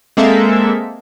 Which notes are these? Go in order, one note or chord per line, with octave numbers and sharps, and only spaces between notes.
G#3 A#3 C4 A4 E5